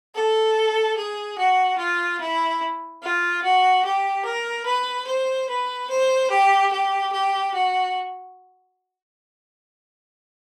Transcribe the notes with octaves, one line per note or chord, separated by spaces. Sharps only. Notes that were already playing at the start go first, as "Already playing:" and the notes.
A4
G#4
F#4
F4
E4
F4
F#4
G4
A#4
B4
C5
B4
C5
G4
G4
G4
F#4